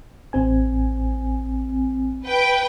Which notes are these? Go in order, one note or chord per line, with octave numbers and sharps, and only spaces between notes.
A1 C4 G#5
B4 G5